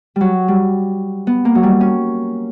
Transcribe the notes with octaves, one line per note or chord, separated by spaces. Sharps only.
F#3 G3
G3
B3
A#3
F#3
G3
C#4